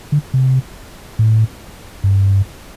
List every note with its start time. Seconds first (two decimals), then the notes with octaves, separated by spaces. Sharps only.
0.12 D3
0.34 C3
1.19 A2
2.04 G2